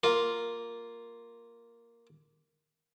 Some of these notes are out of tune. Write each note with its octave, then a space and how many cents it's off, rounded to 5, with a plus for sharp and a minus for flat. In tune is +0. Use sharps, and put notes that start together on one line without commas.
A#3 +0 F4 +0